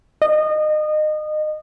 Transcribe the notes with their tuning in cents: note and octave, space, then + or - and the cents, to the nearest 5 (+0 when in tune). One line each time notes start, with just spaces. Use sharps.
D#5 -25